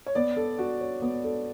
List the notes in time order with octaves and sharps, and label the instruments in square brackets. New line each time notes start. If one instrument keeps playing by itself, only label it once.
[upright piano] C#5
[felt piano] B3 [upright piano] D5
[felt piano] A4
F#4
C#5
B3
A4